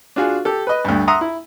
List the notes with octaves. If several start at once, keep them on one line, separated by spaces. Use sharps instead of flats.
D4 F4 F#4 G#4
G4 A4
B4 D#5
D2 G2
E5 F#5 A#5 C6 D#6
E4